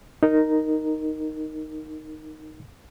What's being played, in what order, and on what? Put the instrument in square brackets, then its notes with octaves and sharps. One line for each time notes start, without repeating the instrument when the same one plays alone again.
[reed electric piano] D#4 A#4